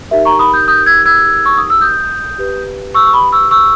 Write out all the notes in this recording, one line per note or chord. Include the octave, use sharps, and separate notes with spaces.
D#4 G4 A#4 E5
A#5 C#6
B5 D#6
D#6 G6
D#6 G6
E6 G#6
E6 G#6
C#6
D#6
E6
D#6 G6
G4 B4
C#6 E6
C#6
B5 D#6
C#6 E6
C#6 E6